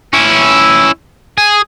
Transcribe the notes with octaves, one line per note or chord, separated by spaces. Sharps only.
C#4 E4
G#4